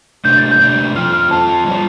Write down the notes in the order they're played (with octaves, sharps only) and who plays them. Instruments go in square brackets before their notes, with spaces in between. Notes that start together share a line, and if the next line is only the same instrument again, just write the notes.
[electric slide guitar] C3 A3 D4 [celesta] G6
[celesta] A6
G6
[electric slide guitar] C3 A3 D4
[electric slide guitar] F3 C4 F4 [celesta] F6
[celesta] F6
[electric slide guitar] F3 C4 F4 [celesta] A5
[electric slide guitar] G3 F4